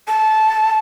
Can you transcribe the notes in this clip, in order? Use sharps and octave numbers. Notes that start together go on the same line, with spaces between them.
A5